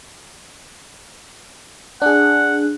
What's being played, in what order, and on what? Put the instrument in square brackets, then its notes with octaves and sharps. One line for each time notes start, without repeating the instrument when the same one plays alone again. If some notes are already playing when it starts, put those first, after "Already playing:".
[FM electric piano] D4 G#4 [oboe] F#5